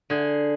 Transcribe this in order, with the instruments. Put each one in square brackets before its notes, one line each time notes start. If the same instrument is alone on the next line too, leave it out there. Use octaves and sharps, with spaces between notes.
[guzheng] D3 G#4